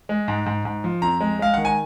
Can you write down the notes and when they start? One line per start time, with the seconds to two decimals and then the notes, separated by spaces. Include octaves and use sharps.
0.09 G#3
0.28 G#2
0.46 G#2
0.65 G#2
0.84 F3
1.02 F2 A#5
1.20 G#3
1.39 G#3 F5
1.54 D#3 F#5
1.65 G#5